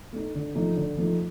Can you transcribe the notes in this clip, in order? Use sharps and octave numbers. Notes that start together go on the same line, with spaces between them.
A3 D#4
D3
F3 A3 D#4
D3
F3 A3 D#4